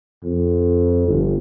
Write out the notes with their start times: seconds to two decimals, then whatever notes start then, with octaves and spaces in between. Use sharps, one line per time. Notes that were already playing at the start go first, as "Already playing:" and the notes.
0.23 F2
1.08 G1